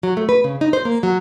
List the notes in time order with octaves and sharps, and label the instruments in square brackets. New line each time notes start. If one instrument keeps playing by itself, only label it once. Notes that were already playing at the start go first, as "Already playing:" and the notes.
[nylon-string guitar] F#3
A3
B4
C#3
D#4
C5
A#3
F#3